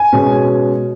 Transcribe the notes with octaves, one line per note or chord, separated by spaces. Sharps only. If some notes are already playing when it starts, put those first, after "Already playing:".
Already playing: G#5
B2 G#3 C#4